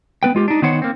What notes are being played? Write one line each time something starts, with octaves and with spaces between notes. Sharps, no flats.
B3 B4 G5
G#3 F4 G4
D4 D#4
D#3 B3 C5 C#5 F#5
A#3 C4